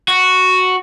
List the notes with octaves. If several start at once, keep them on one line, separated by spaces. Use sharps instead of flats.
F#4